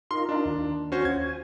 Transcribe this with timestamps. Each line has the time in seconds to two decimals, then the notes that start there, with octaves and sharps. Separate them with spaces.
0.11 D#4 F4 A#4 C6
0.29 D4
0.46 D#2
0.92 C#4 F#4 C5
1.05 F4 G#6
1.26 G#5